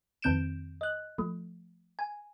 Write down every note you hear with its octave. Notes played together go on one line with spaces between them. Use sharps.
F2 D#3 C4 G6 D7 E7
D#5 F#6
F3 A3
G#5